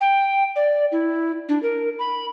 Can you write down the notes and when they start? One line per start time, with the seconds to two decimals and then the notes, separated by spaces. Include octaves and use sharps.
0.01 G5
0.56 D5
0.92 E4
1.49 D4
1.63 A#4
1.99 B5